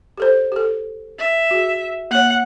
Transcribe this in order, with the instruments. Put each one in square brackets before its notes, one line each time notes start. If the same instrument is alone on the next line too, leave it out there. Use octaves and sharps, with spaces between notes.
[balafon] G4 A4 C5
G4 A4
[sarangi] E5
[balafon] F#4 G#4
[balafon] A#3 C#5 [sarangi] F#5